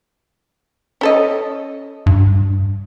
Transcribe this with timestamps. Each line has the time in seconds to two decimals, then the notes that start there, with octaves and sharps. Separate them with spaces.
1.01 C#4 A4 D#5
2.06 G2